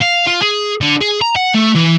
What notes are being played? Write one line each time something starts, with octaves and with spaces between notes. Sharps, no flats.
F5
F4
G#4
D3
G#4
A#5
F#5
A3
E3